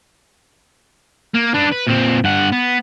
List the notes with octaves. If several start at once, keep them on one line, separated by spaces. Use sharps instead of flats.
A#3
D4 B4
B4
A#2 C4
G2 F#5
B3